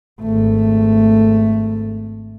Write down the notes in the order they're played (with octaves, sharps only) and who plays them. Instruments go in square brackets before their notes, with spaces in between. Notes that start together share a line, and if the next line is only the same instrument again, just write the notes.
[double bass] G#1 A3